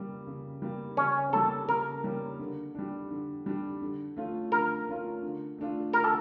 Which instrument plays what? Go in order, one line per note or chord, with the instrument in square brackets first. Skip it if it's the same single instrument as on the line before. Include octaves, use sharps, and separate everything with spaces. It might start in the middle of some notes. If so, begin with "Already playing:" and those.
Already playing: [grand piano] C#3 G3 A#3
C#3
G3 A#3
[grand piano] C#3 [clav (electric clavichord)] C#4
[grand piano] G3 A#3 C#4 [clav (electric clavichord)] A4
[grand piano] C#3 [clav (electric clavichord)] A#4
[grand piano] G3 A#3 C#4
D3
G3 D4
D3
G3 D4
D3
A3 C#4 F4
[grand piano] D3 [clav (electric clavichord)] A#4
[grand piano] A3 C#4 F4
D3
A3 D4 F4
[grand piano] D3 [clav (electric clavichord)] A#4
[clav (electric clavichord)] A4